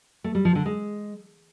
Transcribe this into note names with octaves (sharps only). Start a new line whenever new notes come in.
A3
G3
F3
D3
G#3